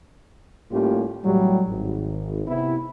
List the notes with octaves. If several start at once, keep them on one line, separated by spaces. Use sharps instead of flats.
A2 G3 A#3 C#4 F4 G4
A1 A2 F#3 G3
G#1
C3 B3 E4